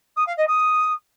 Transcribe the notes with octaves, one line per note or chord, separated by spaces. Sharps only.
D#6
F5
D#5
D#6